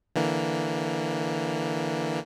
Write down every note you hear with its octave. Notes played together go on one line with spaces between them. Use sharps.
D3 E3 A#3